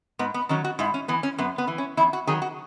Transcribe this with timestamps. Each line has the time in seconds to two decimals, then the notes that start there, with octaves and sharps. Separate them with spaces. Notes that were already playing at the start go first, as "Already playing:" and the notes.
0.19 G#2 B3
0.34 B3
0.49 D#3 F#3 C#4
0.64 F#4
0.79 G#2 E4
0.94 C#4
1.08 E3 B3
1.23 C#4
1.38 F#2 B3
1.58 B3
1.67 E3
1.78 C#4
1.97 E2 E4
2.13 F#4
2.27 D#3 F#3 G#4
2.42 F#4